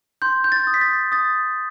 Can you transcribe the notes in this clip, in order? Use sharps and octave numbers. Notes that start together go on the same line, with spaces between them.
C6 G6
G6
A6
D#6
B6
A6
D#6 A6